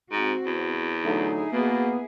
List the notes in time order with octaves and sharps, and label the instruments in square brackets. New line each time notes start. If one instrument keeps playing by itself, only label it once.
[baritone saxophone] G#2 [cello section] C4 F#4
[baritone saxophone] E2
[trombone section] D3 F#3 A3 [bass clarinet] D#4 [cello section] E4 G#4
[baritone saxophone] B2 [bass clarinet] A#3 [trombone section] B3